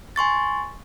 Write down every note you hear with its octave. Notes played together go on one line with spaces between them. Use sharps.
G#5 C6 C#6 A6